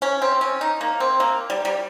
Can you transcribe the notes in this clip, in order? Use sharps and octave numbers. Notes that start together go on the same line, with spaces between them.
C#4
C4
C#4
D#4
A#3
C4
A#3
G3
G3